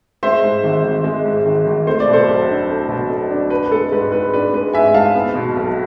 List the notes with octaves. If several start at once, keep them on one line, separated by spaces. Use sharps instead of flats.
G#3 C5 E5
G#2
G#1
G#1
G#3
G#2
G#1
G#1
A3 C5
D5
B2
A4 C5
B1
D4
A3
B2
B1
D4
D4 B4
B4
G#3 A4
G#2 B4
G#2 B4
D4 B4
G#3 B4
G#2 E5 G#5
G#2 F5 A5
B3
B2
B1